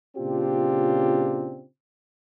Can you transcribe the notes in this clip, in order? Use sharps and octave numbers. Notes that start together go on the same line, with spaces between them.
A#2 C#3 C4 D4 F4 G4